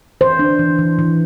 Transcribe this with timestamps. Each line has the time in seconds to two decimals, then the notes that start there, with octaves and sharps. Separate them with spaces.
0.21 E3 C5
0.39 D4
0.59 E3
0.79 E3
0.99 E3